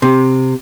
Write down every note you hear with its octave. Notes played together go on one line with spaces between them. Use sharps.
C3